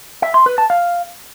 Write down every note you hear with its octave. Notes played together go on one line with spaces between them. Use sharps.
E5
C6
B4
A5
F5